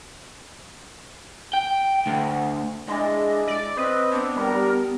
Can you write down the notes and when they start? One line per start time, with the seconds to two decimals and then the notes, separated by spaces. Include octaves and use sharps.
1.54 G5
2.07 D2
2.88 G#3 D4 E4 D#5
3.47 D5
3.77 C4 B4 D#5
4.12 B3 D4
4.36 G3 A#4